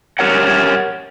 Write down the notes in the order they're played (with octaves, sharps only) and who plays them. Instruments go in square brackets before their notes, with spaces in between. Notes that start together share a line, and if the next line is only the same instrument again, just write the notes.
[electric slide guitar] G4 A#4 C#5 F#5